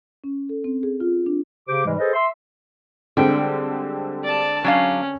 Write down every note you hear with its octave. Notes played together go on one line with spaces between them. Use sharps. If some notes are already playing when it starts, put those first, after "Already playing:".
C#4
A4
C4
G#4
F4
D4
C#3 G4 C5 D6
G#2 C3 E3 G3 G#3
G#4 A4 B4 C5 D#5
E5 C6
D3 G3 G#3 C4 G5
D5 A5
F#3 C#4 D4 F5